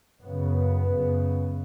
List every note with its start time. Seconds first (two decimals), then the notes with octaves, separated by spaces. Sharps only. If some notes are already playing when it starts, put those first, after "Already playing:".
0.23 F#2 C#3 B3
0.90 F#2 C#3